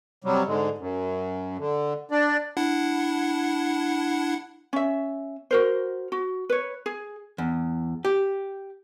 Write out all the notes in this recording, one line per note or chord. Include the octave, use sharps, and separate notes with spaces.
C3 F#3 G3
G#2 D3 G#3
F#2
D3
D4 D5
D4 E4 F#5
C#4 E5
F#4 A#4 C5
F#4
B4 C#5
G#4
E2
G4